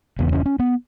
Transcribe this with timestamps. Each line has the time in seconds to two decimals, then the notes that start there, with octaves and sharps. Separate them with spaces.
0.19 E1 E2 C#3 B3
0.32 C#4
0.46 C#4
0.59 B3